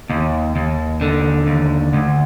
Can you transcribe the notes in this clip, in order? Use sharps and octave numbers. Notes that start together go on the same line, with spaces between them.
D#2
D#2
D3
D#2
D2